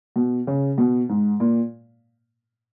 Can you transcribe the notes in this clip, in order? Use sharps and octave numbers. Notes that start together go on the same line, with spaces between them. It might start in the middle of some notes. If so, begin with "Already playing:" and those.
B2
C#3
B2
G#2
A#2